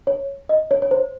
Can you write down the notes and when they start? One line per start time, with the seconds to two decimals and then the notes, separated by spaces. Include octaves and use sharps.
0.07 C#5
0.49 D#5
0.71 C#5
0.82 C#5
0.91 C5